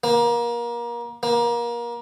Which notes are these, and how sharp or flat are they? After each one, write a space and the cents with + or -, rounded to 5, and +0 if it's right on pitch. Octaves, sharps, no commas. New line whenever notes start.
A#3 +30
A#3 +30